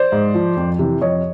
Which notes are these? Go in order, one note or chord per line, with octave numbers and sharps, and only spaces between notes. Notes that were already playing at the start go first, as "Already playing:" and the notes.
Already playing: C5 D5
G#2
F3
F2
C3 E3
F2 C#5 D#5